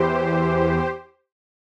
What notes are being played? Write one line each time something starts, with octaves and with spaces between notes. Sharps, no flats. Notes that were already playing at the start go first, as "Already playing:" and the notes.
Already playing: E2 E3 G4 C5